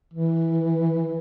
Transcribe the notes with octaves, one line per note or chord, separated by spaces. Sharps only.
E3